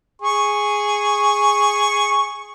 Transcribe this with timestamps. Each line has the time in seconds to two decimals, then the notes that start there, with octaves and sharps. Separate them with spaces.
0.22 G#4 C#6